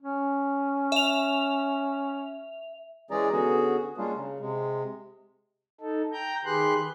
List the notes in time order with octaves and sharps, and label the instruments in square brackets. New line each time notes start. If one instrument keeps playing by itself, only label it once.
[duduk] C#4
[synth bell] E5 F7
[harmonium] E3 G#3 C#4 G#4 D5 A#5
D3 B3 C#4 F#4 G#4
G3 G#3 A#3 C#4 D4 F4
C#3
C3 G#3
[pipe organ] D#4 A4
G5 A#5 G6
D#3 G4 G#4 B4 C6 F#6